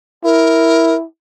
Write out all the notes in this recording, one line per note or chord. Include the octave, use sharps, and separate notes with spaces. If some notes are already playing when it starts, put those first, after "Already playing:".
E4 A#4